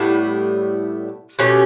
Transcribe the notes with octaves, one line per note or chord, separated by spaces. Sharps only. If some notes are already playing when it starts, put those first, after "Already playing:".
Already playing: A2 G3 B3 E4
B2 A3 C#4 G4